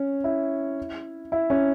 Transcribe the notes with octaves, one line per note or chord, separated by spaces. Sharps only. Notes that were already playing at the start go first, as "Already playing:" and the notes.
Already playing: C#4
E4
E4
C#4